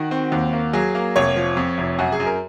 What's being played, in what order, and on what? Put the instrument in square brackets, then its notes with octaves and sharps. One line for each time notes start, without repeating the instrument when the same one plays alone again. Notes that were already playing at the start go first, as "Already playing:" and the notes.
Already playing: [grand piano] D#3 F#4
C4
D#2
A#3
F#3 G#4
A#3
F1 C#5
F3
F2
F1
F#2 F#4
G#4
F#2
A#4